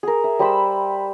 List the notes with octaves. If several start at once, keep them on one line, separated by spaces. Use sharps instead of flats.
G#4 A#4
E5
G3 C5 B5 E6